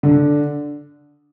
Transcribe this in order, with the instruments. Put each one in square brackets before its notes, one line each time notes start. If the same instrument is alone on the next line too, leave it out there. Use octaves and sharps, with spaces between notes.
[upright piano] D3